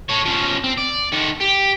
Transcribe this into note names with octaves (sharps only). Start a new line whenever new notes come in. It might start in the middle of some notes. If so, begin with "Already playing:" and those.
A4 C#5
F3 C#4
C4
D5
D#3 A4
G4